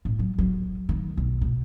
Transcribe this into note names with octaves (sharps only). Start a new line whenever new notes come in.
A2
F#3
F#3
D#3
B1
B2